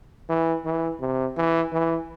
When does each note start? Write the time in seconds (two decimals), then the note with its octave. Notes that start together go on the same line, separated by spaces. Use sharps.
0.29 E3
0.65 E3
1.01 C3
1.37 E3
1.73 E3